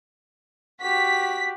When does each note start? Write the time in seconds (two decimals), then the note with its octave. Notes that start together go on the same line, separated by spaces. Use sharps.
0.82 F#4 G4 B6